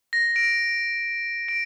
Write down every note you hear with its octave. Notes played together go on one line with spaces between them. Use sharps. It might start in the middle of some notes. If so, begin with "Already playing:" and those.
A#6
D7
D7